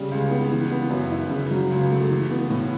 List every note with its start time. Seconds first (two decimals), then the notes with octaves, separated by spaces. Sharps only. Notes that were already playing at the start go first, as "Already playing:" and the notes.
Already playing: C#3 G3
0.12 C#2
0.31 B3
0.51 E3
0.71 B3
0.91 F#2
1.11 E4
1.30 C#3
1.51 F#3
1.70 C#2
1.90 A3
2.10 E3
2.31 B3
2.50 A2